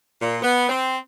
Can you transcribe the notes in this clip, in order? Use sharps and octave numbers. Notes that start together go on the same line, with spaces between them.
A#2
B3
C4